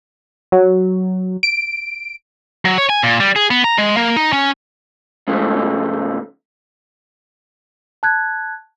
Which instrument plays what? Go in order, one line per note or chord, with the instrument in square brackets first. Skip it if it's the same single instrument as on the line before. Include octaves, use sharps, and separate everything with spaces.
[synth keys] F#3
D7
[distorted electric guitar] F#3
C#5
G#5
A#2
G3
G#4
B3
A#5
G#3
A#3
D#4
C#4
[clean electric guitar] G#2 C#3 F3 G#3 A3
[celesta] A5 F#6 G#6